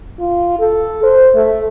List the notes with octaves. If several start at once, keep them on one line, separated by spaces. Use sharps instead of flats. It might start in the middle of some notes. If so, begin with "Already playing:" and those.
F4
A4
C5
A3